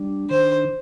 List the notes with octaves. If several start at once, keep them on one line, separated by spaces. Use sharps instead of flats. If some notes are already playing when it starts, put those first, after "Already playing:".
Already playing: G3 D4
D#3 C5